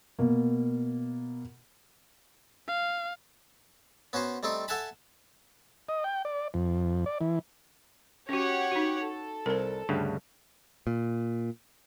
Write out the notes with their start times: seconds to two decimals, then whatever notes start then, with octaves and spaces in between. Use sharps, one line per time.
0.19 B2 A#3
2.68 F5
4.13 B3 C#4 F#4 C5
4.43 G3 A3 C4 D#4
4.68 A4 E5 F#5 G#5 A5 B5
5.89 D#5
6.04 G5
6.25 D5
6.54 F2
7.06 D5
7.21 E3
8.29 C#4 F#4 G4 C#5 F#5
8.72 D#4 F#4
9.03 A4
9.46 C2 A#4 C5
9.89 D2 G2 C#3
10.87 A#2